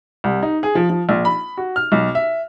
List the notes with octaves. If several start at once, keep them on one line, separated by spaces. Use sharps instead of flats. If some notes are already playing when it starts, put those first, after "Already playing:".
C2
D#4
G#4
F3
F3
A#1
B5
F#4
F6
B1
E5